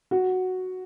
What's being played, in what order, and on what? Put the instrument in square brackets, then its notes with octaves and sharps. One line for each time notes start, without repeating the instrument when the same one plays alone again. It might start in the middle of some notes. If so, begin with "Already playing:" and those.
[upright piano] F#4